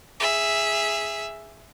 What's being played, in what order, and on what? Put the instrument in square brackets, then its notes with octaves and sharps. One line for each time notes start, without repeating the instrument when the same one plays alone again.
[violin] G#4 E5